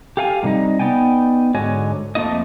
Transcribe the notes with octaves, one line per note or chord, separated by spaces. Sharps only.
G4 A4 F5 G5 G#5
A2 C3 G3 D#4 D#5
B3 D#4 D5 G5 G#5
G#2 D3 F#4 C#5 D#5 G#5
F2 F3 A3 A#3 E4 D#5